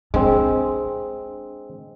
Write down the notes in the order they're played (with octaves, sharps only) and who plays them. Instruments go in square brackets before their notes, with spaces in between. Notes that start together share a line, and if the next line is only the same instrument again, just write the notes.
[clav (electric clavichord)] G#3 C4 [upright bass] D4